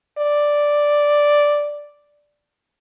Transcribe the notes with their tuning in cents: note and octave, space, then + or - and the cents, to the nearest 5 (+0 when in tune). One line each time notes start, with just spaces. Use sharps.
D5 +0